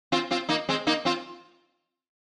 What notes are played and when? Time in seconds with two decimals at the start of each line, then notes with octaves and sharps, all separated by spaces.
0.12 C4 F4
0.31 C4 F4
0.49 A#3 D#4
0.69 G#3 C4
0.87 A#3 D#4
1.05 C4 F4